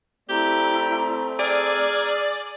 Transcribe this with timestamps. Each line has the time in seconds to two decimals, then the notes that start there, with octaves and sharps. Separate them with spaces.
0.29 A3 C4 E4 G4 D5 A#5
1.39 G#4 D5 A#5 E6 F6